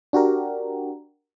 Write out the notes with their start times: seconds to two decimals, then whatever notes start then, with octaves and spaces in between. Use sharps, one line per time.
0.13 D4 F#4 G4 A#4